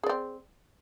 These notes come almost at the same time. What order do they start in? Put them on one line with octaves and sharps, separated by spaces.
G#4 D5 C4